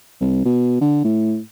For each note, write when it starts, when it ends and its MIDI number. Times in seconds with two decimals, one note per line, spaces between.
0.21 0.42 36
0.45 0.80 47
0.81 1.01 50
1.04 1.39 45